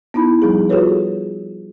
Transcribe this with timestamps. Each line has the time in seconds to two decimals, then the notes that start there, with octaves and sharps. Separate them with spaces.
0.14 B3 D#4 E4 B5
0.42 F3 G3 D#4 G#4
0.70 F4 F#4 G#4 A4 B4 C#5